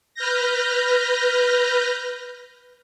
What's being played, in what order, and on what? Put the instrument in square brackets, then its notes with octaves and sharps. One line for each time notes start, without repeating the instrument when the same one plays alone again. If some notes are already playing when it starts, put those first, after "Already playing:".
[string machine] B4 F6 G6 A#6